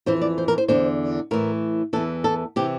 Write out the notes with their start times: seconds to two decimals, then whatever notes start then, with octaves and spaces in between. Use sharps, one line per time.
0.06 F2 E3 C5
0.21 D5
0.38 C5
0.48 A#4
0.58 C5
0.68 E2 D3 C5
1.31 A2 E3 A#4
1.93 E2 E3 A4
2.24 A4
2.56 C3 E3 G4